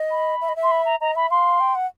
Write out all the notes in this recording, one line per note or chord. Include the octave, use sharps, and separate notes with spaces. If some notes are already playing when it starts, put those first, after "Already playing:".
Already playing: D#5
B5
E5
D#5
E5
C6
B5
A#5
D#5 A#5
E5 B5
F5 C6
G5
F#5